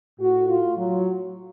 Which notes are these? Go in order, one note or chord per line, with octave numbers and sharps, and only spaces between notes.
A2 F#4
F4
F#3